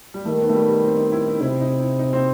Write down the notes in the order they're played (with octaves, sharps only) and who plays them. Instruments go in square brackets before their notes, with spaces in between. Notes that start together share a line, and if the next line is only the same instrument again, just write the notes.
[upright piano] G3
[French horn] D#3 [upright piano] A3
[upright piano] B3
A3
G3
G3
C4
D#4
E4
D#4
[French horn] C3 [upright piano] E4
[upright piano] D#4
E4
D#4
C4